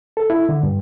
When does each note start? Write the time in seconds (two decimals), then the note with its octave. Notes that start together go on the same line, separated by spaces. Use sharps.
0.17 A4
0.30 E4
0.49 D3
0.63 G2